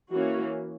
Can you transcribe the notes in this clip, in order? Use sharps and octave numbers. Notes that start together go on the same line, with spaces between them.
E3 A#3 C#4 F#4